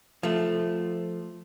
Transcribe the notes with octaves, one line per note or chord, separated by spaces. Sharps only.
F3 A3